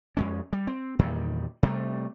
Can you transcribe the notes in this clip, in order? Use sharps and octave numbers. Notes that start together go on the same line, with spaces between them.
F2 G#3 C#4
G3
C4
E2 A#2 D#3 G3
C3 G3 A3